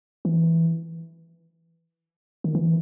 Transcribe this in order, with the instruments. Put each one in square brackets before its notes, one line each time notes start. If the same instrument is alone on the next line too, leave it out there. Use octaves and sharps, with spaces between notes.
[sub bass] E3
D#3
E3